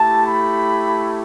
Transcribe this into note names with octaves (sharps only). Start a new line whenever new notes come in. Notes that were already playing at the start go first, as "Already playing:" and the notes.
Already playing: A3 E4 G4 A5
B5